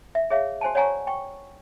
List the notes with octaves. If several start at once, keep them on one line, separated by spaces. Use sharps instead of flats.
E5
G#4 C#5 E5 F5
F#4 C5 G#5 A5
C#5 D5 F#5 G#5 A#5 C#6
G5 C#6